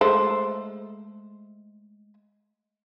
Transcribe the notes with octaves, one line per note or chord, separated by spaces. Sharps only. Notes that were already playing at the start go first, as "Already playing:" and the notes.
G#3 A3 C5